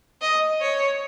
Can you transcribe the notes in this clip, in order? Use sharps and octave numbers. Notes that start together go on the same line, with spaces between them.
D#5
C#5